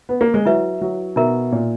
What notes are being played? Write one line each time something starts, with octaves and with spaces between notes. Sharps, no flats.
B3
A#3
G#3
F#3 E4 B4 E5
F#3
B2 D#4 A#4 E5 A#5
A#2